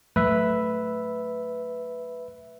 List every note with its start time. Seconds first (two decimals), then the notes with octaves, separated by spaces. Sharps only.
0.16 F#3 A3 B4 E5